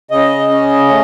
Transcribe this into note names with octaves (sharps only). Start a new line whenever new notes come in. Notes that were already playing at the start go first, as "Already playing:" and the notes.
C#3 D#5
C#4
A3